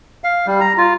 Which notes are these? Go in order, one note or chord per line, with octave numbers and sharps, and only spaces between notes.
F5
G3
A#5
F4